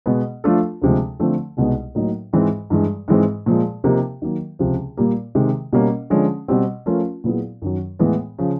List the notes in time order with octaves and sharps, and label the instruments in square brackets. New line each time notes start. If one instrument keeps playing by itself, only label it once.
[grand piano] B2 G#3 B3
F3 A3 D4 F4 A4
D2 C3 F3 G#3
D3 F3 A3 C4
C2 B2 G#3 B3 D#4
A2 F#3 A#3 D#4
G#2 E3 G#3 C4
G2 E3 G#3
G#2 E3 G#3 C4
A#2 F3 G#3
C3 F3 A#3 D#4 G4
D#3 F#3 A#3
C#2 C3 F3
A#2 G3 A#3
C3 D#3 G#3
B2 G3 A#3 C#4
D3 F3 G#3 C#4
B2 G3 C4
F3 A3 C#4 F4 A#4
A#2 F#3 B3 E4 G#4
F#2 D#3 F#3
A2 E3 G#3 B3
C#3 F3